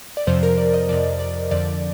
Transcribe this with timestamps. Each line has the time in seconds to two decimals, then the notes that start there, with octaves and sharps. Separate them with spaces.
0.17 D5
0.27 F2 C3 F3 C5
0.43 A#4
0.58 D5
0.74 D#5
0.89 F2 C3 F3 D5
1.19 D5
1.51 F2 D3 F3 D5